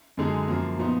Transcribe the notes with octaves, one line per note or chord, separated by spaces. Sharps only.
F#2 D3 G#3 D#4 G#4
F#2 F3 A#3
A#2 F3 B3 D#4